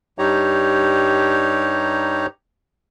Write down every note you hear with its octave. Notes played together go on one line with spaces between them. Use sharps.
G2 G3 D#4 G4 C#5 A#5